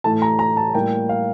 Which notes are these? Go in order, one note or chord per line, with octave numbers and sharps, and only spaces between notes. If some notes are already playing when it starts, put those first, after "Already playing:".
A2 E3 A3 A5
A#5
A#5
A5
A2 G3 A#3 G5
F5